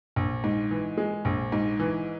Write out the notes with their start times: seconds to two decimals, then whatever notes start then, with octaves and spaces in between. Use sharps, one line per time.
0.16 A#1
0.44 G#2
0.71 E3
0.97 G#3
1.25 A#1
1.52 G#2
1.80 E3